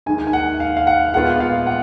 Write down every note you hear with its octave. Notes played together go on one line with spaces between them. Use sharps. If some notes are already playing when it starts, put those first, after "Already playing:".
D#2 D#3 G#3 D#4 G#5
G#5
F#5
F5
F5
F#5
A#2 G#3 B3 F4 F#5
F5
F#5